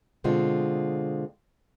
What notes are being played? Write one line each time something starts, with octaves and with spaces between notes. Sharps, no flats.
B2 D3 G#3 C4 F4